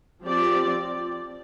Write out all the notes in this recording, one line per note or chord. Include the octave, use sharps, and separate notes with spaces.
F3 C4 G4 D5